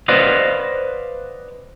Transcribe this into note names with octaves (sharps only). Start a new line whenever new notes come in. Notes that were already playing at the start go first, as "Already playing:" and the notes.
B4 C5 D5 D#5 F5 F#5